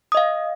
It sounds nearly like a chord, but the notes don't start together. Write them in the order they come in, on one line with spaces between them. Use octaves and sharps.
D#6 D#5 F5